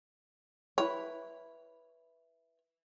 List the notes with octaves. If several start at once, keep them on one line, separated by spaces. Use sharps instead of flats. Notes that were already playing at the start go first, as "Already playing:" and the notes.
E4 B4 C#5